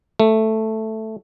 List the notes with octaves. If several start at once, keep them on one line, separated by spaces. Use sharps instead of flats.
A3